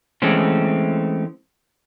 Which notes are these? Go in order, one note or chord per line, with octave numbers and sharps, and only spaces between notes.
E3 G#3 A3 C4 C#4